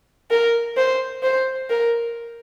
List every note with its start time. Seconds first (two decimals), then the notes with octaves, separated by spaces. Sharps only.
0.31 A#4
0.77 C5
1.23 C5
1.70 A#4